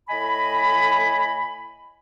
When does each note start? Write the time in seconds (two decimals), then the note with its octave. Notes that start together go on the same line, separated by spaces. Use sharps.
0.09 A2 D#5 G#5 B5